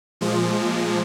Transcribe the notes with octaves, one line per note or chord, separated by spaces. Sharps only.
A#2 F3 G#3